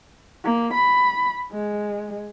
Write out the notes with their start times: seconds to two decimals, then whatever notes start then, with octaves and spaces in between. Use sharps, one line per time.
0.44 A#3
0.73 B5
1.52 G#3